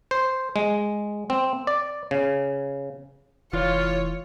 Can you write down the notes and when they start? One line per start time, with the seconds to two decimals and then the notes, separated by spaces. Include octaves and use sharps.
0.11 C5
0.56 G#3
1.30 C4
1.67 D5
2.11 C#3
3.53 F1 E3 F4 C#5